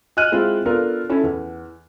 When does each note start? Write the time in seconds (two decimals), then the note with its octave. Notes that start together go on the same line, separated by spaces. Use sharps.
0.17 D#5 G#5 F6 F#6 D#7
0.32 G#3 C4 E4 F4
0.65 B3 D4 F4 A4 A#4
1.10 C#4 E4 A4
1.23 E2